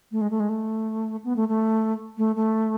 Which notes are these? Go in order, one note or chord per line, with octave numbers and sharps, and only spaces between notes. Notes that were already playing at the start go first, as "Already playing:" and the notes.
A3
G#3
A3
G#3
A3
B3
A3
A3
A3
A3